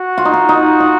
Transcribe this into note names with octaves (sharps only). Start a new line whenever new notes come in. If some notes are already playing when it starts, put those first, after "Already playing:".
Already playing: F#4
F4
D#4
F4
D#4
D#4